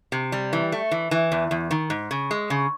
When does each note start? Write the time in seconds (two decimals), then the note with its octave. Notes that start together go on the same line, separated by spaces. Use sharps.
0.12 C3
0.32 G3
0.53 E3
0.72 A3
0.91 E3
1.11 E3
1.32 E2
1.51 E2
1.71 D#3
1.90 G#2
2.11 C#3
2.31 G#3
2.50 C#3